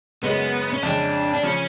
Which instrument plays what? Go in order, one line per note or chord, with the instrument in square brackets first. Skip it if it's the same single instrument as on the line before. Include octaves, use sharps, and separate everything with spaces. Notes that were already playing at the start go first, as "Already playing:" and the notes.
[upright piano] F#2 C#3 G#3 C#4 [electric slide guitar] B3
[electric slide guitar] C#4
[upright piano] F2 C#3 G#3 [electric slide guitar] D4
[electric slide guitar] D4
[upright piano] C#3 F3 [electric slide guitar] C#4